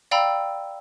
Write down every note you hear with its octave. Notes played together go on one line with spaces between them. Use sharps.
D5 F5 G5 A#5 B5 E6